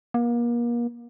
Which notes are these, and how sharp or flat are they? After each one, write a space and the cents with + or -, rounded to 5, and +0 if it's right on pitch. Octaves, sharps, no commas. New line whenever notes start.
A#3 +35